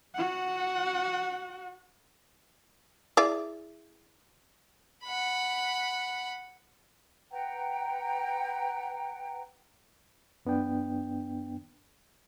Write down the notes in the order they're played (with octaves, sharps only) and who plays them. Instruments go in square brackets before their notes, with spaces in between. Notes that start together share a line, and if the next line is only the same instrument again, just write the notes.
[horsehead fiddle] F#4 F#5
[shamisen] E4 G#4 D5
[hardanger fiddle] F#5 B5
[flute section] B4 F#5 G5 A#5
[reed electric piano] F#2 B3 D4 G5